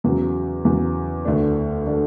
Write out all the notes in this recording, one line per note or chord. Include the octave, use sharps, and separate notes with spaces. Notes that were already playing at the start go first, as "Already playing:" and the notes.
E2 C#3 F#3
E2 C#3 F#3
D2 D3 A3 D4
D3 A3 D4